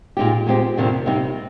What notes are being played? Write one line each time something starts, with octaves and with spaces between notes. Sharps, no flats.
A#2 G#3 D#4 G4
A#2 G#3 C4 G4
F2 C3 D#3 A#3 D4
C3 G3 A#3 D#4